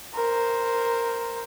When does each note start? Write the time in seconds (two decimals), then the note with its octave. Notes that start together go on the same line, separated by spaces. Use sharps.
0.14 A#4 C5